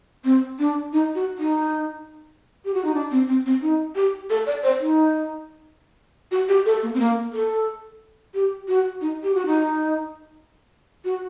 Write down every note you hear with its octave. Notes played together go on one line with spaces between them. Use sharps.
C4
D4
D#4
F#4
D#4
G4
F#4
D#4
D4
C4
C4
C4
D#4
G4
A4
D5
C5
D#4
F#4
G4
A4
A#3
C4
A#3
A4
G4
F#4
D#4
G4
F#4
D#4
F#4